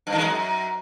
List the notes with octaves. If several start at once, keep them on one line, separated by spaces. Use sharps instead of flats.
G2
D#3
G#3
F#2